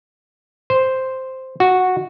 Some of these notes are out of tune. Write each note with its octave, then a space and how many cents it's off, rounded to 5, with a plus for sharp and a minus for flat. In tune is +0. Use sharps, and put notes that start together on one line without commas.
C5 +0
F#4 -5